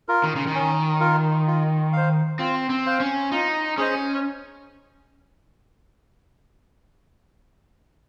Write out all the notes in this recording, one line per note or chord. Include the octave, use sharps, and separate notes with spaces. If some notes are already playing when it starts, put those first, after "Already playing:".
F4 A#4
D#3
C#3
D#3
C#4
F4 A#4
F4
C5 F5
C4 F4
C4
C5 F5
C#4
D#4 F4
C#4 G#4 C5 D#5